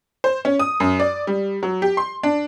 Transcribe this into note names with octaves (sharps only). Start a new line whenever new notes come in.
C5
C#4
D#6
F#2
D5
G3
F#3
G4
C6
D4